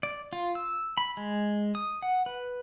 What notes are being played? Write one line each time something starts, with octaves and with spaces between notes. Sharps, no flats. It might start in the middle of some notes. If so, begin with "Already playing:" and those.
D5
F4
E6
B5
G#3
D#6
F#5
B4